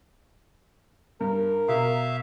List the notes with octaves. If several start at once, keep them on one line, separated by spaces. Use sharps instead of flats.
G2 A#4
B2 E5 F5